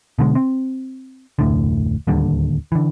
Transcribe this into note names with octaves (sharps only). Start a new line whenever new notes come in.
B2 D3 G#3
C4
F1 D2 A2 D3
D1 D#2 D3 G3
D3 E3